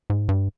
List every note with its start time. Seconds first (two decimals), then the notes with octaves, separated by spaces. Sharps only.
0.10 G#2
0.29 G2